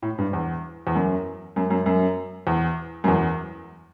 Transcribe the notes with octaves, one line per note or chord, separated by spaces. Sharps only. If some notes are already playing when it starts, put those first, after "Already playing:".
A2
G2
E2
E2
F#2
F#2
F#2
F#2
E2
F#2
E2